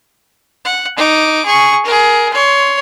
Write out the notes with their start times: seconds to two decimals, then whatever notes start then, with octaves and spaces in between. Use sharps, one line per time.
0.65 F#5
0.97 D#4 D6
1.45 G#4 C#6
1.85 G#4 A#4
2.33 C#5 C6